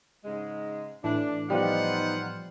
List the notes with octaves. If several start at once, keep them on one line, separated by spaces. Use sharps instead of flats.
G#2 C#3 G#3
A2 E3 D4
F3 G3 B3 D#4 F4 C5 F#5